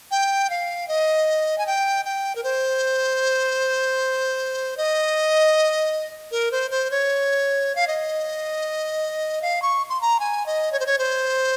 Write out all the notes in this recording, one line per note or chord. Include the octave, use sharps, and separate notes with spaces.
G5
F5
D#5
G#5
G5
G5
A#4
C5
D#5
A#4
C5
C5
C#5
F5
D#5
F5
C#6
C6
A#5
G#5
D#5
C#5
C5
C#5
C5